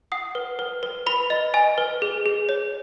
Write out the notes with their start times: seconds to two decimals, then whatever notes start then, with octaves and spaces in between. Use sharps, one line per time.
0.12 F#5 D#6
0.35 B4
0.59 B4
0.83 B4
1.06 B4 B5
1.30 D#5
1.54 D#5 G#5
1.78 B4
2.02 G#4
2.26 G#4
2.49 C#5